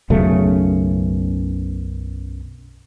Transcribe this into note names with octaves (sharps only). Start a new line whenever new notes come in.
B1 F#2 C#3 A3